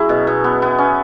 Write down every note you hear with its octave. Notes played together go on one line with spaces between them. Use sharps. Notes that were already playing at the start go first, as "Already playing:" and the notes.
Already playing: F#3 C#4 E4 G#4
B2
B2
B3
B3
C#4